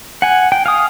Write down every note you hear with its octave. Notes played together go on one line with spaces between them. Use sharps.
F#5 G#5
G5
F5 G#5 D#6